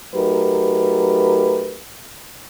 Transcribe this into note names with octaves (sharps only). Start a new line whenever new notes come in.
F#3 A3 D#4 G4 A#4 B4